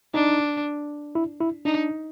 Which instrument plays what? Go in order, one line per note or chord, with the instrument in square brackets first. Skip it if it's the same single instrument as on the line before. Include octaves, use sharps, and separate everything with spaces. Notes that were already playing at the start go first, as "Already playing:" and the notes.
[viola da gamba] D4 [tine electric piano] D#4
[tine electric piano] E4
E4
[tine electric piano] D4 [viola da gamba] D#4